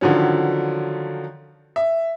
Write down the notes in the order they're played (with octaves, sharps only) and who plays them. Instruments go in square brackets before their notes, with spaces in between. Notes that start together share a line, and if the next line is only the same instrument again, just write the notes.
[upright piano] D3 D#3 F3 F#3 C#4
E5